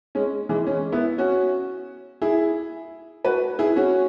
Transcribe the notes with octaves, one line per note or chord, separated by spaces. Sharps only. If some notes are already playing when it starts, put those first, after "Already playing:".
G#3 C#4
E3 G#3
G#3 C#4
B3 E4
C#4 F#4
E4 G#4
F#4 B4
E4 G#4
C#4 F#4